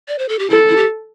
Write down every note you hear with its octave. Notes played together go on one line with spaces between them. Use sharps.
D5
C5
A4
G4
E4 A4
E4
G4